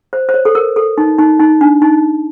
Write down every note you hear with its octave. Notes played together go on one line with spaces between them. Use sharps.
C5
C5
C#5
A4
A#4
A4
D#4
D#4
D#4
D4
D#4